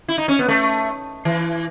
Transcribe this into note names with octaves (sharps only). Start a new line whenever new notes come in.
E4
D#4
C#4
B3
A3
E3